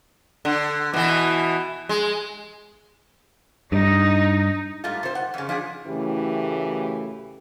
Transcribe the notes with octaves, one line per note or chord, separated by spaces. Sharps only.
D3
B2 E3
G#3
G2 D#4
G#2 G3 A3 F4
C3 C5
F#5
F2 C#3
F3 D4 G#4
F#2 A2 C#3 E3 A3 G4